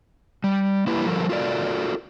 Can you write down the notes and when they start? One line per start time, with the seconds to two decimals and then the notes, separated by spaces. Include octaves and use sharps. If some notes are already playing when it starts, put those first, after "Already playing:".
0.44 G3
0.87 A#3 E4 G4 B4
1.06 F3 G3 G4 A4 A#4
1.29 F4 F#4 A4 A#4 D5